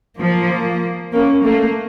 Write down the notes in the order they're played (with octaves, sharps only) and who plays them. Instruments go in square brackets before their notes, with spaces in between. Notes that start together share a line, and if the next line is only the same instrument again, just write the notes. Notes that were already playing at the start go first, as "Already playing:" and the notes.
[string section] F3 [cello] A#3
[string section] A#3 [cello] C#4
[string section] A3 [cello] A#3